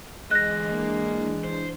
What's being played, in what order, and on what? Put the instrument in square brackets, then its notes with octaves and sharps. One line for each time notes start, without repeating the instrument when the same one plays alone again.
[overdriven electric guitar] D2 D#5 [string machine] E3 D4 [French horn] G#3 [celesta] F#6 A#6
[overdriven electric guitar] A#3
C5